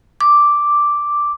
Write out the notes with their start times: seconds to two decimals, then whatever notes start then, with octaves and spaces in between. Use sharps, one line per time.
0.21 D6